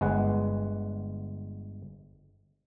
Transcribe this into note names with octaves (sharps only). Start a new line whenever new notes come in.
G1 G#3 B4 F#5